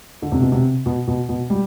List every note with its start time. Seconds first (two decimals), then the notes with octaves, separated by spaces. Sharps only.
0.22 D3
0.32 C3
0.42 B2
0.52 C3
0.86 B2
1.07 B2
1.29 B2
1.50 G3